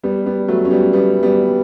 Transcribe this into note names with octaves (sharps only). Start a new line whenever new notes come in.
G3 B3
G3 B3
F#3 A3
C#4
G3 B3
G3 B3
G3 B3